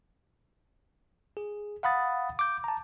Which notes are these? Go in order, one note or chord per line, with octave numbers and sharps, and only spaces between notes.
G#4
F5 F#5 B5 D#6 A6
D6 G6
A5 A#5